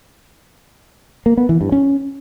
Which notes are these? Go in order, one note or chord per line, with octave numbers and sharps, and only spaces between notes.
A#3
B3
E3
G2
C#4